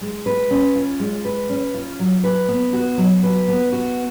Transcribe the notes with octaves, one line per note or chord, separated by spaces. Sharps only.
G#3
B4
C#4
F4
G#3
B4
C#4
F4
F#3
B4
B3
F#4
F#3
B4
B3
F#4